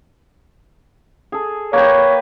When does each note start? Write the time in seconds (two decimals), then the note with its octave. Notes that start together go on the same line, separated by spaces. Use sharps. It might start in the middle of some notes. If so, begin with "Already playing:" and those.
1.32 G#4 A4
1.73 A#3 B4 C#5 G5